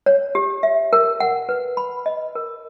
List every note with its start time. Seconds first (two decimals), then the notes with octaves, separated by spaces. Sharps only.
0.06 C#5
0.35 G4
0.63 E5
0.93 A#4
1.20 F#5
1.49 B4
1.77 B5
2.06 D#5
2.35 A#4